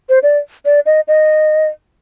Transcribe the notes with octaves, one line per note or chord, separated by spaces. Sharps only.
C5
D5
D5
D#5
D#5